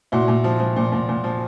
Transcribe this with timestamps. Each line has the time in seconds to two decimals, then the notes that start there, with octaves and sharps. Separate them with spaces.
0.12 A#2 E4 F#4
0.28 A#2
0.44 F3
0.60 F3
0.76 A#2
0.92 A#2
1.09 A#2
1.24 F3